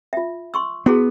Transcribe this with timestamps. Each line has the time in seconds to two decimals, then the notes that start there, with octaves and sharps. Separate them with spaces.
0.13 F4 E5
0.54 C6 C#6 E6
0.86 B3 E4 F#4 G#4